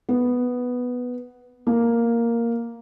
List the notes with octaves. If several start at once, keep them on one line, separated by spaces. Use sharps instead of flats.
B3
A#3